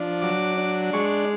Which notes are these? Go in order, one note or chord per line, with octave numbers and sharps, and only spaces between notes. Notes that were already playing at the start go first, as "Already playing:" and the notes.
Already playing: F3 D4
F#3 D6
D4
G#3 C#6